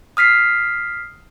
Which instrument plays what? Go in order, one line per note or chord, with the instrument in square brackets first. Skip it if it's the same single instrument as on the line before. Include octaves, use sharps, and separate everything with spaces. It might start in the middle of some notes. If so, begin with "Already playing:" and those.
[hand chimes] D#6 F6 B6 C7